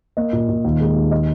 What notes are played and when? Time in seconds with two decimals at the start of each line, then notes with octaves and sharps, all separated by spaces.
0.17 A#3 D#5
0.33 A#2
0.49 A#2
0.64 D#2
0.80 G#3
0.95 D#2
1.11 D#5